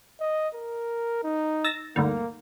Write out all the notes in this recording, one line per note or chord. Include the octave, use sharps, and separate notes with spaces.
D#5
A#4
D#4
E6 A6 A#6
D2 G2 D#3 A#3